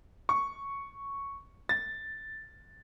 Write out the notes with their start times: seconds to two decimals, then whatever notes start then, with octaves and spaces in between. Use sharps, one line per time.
0.29 C#6
1.69 A6